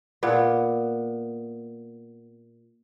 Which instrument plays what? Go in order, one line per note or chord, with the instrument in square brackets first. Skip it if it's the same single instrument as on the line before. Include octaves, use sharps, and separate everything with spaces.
[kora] A#2 B3